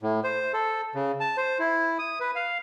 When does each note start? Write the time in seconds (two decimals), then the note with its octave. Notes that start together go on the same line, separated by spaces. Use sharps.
0.03 A2
0.24 C5
0.54 A4
0.95 C#3
1.20 A5
1.37 C5
1.59 E4
1.99 D#6
2.20 B4
2.35 F5